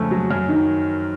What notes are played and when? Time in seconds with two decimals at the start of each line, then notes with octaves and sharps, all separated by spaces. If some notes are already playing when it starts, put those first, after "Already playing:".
Already playing: F2 C#3 G#3 A3
0.11 F#3
0.31 F#2
0.49 D#3